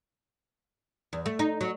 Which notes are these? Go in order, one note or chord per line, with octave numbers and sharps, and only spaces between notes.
E2
A3
D#4
F#3